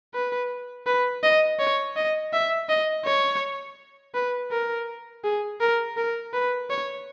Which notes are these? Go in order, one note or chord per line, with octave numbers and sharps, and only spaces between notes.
B4
B4
D#5
C#5
D#5
E5
D#5
C#5
B4
A#4
G#4
A#4
A#4
B4
C#5